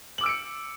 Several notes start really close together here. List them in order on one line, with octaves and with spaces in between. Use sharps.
F#7 D6 E6 D7 C#7